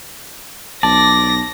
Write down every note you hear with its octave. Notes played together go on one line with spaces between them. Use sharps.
B1 D5 A5 A#6